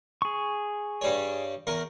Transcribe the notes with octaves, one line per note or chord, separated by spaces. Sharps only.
G#4 C#6
G2 G3 C#5
E2 A#4 C#6